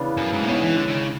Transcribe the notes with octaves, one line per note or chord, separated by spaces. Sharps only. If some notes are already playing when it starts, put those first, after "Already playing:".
Already playing: C#3 E3 B3 D4
F#2
G#2
A2
G#2 B2 G#3 C#4 E4
E3
D3
D3
C#3